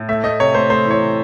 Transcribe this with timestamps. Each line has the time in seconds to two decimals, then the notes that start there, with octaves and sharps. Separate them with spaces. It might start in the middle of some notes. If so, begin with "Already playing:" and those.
Already playing: A2
0.09 A3 E5
0.24 A3 D#5
0.40 C3 C#5
0.55 A3 C5
0.70 A3 C5
0.85 E3
0.91 C#5
1.01 C3